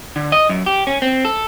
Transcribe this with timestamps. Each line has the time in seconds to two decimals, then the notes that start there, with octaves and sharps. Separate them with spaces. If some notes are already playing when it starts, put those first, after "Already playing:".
0.16 D3
0.32 D#5
0.49 F#2
0.66 G4
0.87 C#4
1.02 C4
1.25 A4